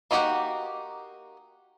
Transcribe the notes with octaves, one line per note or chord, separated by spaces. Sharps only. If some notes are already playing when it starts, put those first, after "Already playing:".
A#3 D#4 F#4 G4 F#5